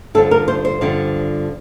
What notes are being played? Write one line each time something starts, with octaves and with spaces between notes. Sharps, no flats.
G2 D3 F3 A4
A#4
C5
C5
G2 D3 F3